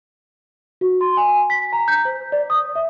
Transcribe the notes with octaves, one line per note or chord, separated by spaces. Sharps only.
F#4
C6
G#5
B6
A#5
G6
C5
D5
D#6
E5